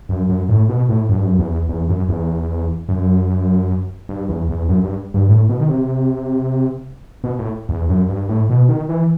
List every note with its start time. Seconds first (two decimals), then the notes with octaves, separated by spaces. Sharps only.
0.09 F#2
0.29 F#2
0.49 A2
0.69 B2
0.89 A2
1.09 F#2
1.17 G2
1.25 F#2
1.39 E2
1.69 E2
1.89 F#2
2.09 E2
2.89 F#2
4.09 G2
4.29 E2
4.49 E2
4.69 F#2
4.84 G2
5.14 G2
5.29 A2
5.49 B2
5.60 D#3
5.69 C3
7.24 B2
7.39 A2
7.69 E2
7.89 F#2
8.09 G2
8.29 A2
8.49 B2
8.69 D#3
8.89 E3